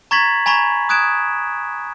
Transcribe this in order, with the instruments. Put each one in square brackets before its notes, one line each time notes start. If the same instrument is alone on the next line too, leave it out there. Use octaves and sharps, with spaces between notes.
[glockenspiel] A#5 C#6 G#6 A6 B6 F#7
G#5 A#5 B5 C#6 G#6
D#6 F#6 G#6 D7 E7